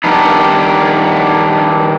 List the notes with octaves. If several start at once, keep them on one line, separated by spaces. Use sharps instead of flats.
D#3 G3 B3 D4 D#4